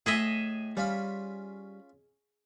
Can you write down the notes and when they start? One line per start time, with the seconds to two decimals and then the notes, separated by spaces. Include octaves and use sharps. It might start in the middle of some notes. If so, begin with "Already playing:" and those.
0.06 A2 G#4 D#5 E5
0.77 G3 C#4 F4 B5